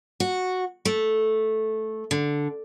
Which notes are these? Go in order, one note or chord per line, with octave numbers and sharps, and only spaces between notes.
F#4
A3
D3